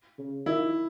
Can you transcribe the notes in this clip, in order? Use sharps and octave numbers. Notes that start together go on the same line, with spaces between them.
C#3
D#3 E4